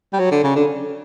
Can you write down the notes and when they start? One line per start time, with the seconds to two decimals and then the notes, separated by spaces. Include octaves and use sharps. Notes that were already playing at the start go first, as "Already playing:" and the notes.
0.13 G3
0.19 F#3
0.31 D3
0.43 C#3
0.56 D3